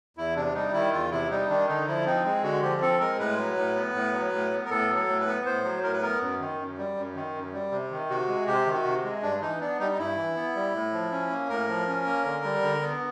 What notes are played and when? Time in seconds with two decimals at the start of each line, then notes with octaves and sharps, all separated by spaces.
0.17 E2 E4
0.36 C3 D4
0.55 G3 D#4
0.73 D#3 E4
0.93 E2 F4
1.11 C3 E4
1.30 G3 D#4
1.49 D#3 D4
1.69 D3 D#4
1.87 F3 E4
2.06 C4 D#4
2.25 G#3
2.43 D3 F#4
2.62 F3 G4
2.81 C4 A4
3.00 G#3 A#4
3.19 A2 B4
3.38 F#3
3.57 A2
3.76 B3
3.95 A2
4.13 F#3
4.32 A2
4.51 B3
4.65 A#4
4.70 A2 A4
4.89 F#3
4.95 A4
5.08 A2
5.20 B4
5.27 B3
5.45 A2 C5
5.64 F#3
5.83 A2 A#4
5.93 B4
6.02 B3 A#4
6.21 F#2
6.40 D#3
6.59 F#2
6.78 G3
6.97 F#2
7.16 D#3
7.34 F#2
7.53 G3
7.72 C3
7.91 D#3
8.09 C3 F#4
8.28 G#3
8.47 C3 G4
8.66 D#3
8.73 F#4
8.85 C3
9.04 G#3
9.22 G2 D4
9.41 E3 D#4
9.60 B3 D4
9.79 G3 D#4
9.92 D#4
9.98 G2 E4
10.17 E3
10.36 B3
10.55 G3
10.74 A2
10.93 F3
11.12 C#4
11.30 A#3
11.49 A2 A#4
11.68 F3
11.87 C#4
12.06 A#3
12.25 D3
12.44 G3
12.63 D3
12.81 B3